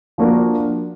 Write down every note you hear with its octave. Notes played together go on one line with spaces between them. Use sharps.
F3 A#3 D4 F#4 A#4